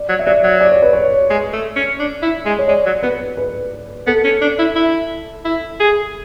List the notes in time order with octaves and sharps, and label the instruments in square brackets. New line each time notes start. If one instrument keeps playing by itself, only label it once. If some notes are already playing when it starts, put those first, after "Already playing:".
Already playing: [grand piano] D5
[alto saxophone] F#3
[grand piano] E5
[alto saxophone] F#3 [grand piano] D5
[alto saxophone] F#3
[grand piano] D5
C#5
B4
C#5
[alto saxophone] G#3
A3
C#4
D4
E4
G#3
[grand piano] C#5
[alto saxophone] G#3 [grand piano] D5
[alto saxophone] F#3
[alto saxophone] B3 [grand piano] B4
[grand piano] B4
[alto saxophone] B3 [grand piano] A4
[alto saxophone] C#4
D4
E4
E4
E4
G#4